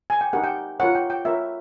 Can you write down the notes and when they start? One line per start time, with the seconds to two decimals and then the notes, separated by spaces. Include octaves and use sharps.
0.10 G#5
0.21 G5
0.33 D#4 G4 A#4 F#5
0.44 G5
0.80 F4 A#4 C#5 F#5
0.95 G5
1.10 G5
1.25 F4 A#4 C#5 E5